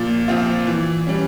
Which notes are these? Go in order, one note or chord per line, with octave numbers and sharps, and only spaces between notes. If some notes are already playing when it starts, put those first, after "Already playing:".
Already playing: A#2 F3 F4
F3 C4 F4
E3
G3 C#4